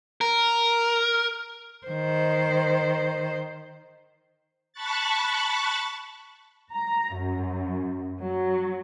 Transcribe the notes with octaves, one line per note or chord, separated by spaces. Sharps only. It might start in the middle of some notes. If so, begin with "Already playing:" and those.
A#4
D#3 C5
A5 B5 C#6 F#6 A6
A#5
F#2
F#3